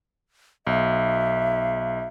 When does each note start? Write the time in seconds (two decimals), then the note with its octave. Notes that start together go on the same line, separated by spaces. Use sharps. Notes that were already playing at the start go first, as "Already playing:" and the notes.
0.67 B1 E5